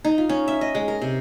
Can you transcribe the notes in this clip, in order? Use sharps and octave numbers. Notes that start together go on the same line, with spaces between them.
D#4
F4
C#4
E5
D#5
G#3
A#4
C3